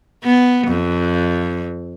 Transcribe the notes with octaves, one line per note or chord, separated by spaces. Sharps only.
B3
F2